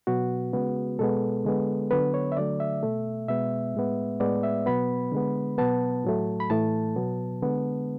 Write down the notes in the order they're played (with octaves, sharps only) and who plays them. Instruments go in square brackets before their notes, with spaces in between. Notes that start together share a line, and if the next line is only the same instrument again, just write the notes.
[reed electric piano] B2 F#3 B3 F#4
C#3 G#3 B3
B2 G#3 B3 A4
D3 G#3 B3
D3 F#3 B3 B4
C#5
E5
D3 F#3 A3 D5
E5
B2 A3
B2 G#3 B3 E5
A2 G#3 B3
A2 G#3 B3 D5
E5
B2 F#3 B3 B5
D3 G#3 B3
B2 F#3 B3 A5
A2 F#3 A3
B5
A2 E3 A3 A5
B2 F#3 B3
D3 G#3 B3